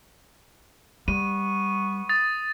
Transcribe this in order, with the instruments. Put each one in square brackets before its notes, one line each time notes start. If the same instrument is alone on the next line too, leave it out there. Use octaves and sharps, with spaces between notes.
[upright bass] G3 [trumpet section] B3 C#6 [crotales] D#7
[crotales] D#6 A6